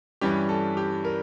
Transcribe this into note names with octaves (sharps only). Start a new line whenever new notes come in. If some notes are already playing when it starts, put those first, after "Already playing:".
G2 E3 G3 C#4 G4
A4
G4
A#4